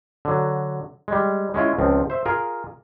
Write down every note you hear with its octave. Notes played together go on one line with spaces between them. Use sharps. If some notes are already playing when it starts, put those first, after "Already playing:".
D3 F#3
G3 G#3
G#3 C#4 E4 F4
C#2 F3 C4
C5 E5
F4 G#4 A#4